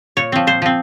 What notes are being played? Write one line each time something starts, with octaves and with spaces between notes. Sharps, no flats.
A#2 C#5
F3 C4
A#2 C5
F3 C4